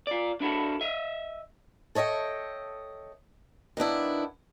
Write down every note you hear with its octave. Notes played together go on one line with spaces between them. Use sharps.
F4 D5
D4 E4 F#4 A4
D#5 E5
A4 C#5 D#5 E5 G5
D#3 B3 D4 E4